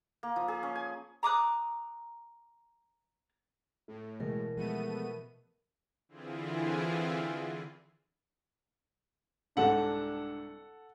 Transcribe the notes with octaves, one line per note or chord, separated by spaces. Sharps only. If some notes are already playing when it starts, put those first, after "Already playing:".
A#3
F3
G#4
C#4
G#5
A#5 D6 D#6 F#6
A2 A3
B2 E3 G#3 A#4
F3 G#3 A3 B3 D#7
D3 E3 C4 E4 F4 G#4
C2 G#2 C3 D4 A4 F#5